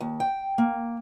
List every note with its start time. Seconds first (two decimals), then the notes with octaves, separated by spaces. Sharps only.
0.01 D#2
0.20 G5
0.58 A#3